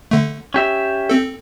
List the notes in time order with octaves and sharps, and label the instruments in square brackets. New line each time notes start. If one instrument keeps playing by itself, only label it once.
[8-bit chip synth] D3 A3
[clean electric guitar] C#4 G4 E5
[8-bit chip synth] C4 A4